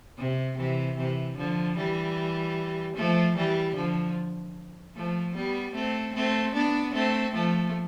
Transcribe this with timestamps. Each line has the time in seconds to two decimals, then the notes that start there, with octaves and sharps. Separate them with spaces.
0.18 C3
0.57 C3 E3
0.97 C3 E3
1.37 D3 F3
1.77 E3 G3
2.96 F3 A3
3.36 E3 G3
3.75 D3 F3
4.96 F3 A3
5.35 G3 B3
5.75 A3 C4
6.14 A3 C4
6.55 B3 D4
6.94 A3 C4
7.34 F3 A3